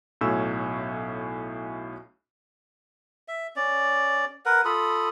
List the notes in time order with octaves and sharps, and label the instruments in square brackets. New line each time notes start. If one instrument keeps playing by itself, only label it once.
[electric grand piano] B1 A2 C#4 F#4 E6
[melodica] E5
C#4 D5
A#4 B4 F#5
F4 A4 B5 D#6